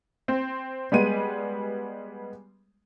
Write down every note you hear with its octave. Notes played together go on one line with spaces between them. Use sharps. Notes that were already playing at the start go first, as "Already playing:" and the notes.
C4
G3 G#3 B3 D#7